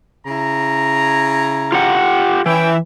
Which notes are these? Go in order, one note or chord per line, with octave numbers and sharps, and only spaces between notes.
C#3 E4 A#5
F4 G4 F#5
E3 C#4 E5 G5